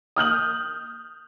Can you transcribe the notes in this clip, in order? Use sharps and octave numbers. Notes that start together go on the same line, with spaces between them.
D#6 F6 G6 F#7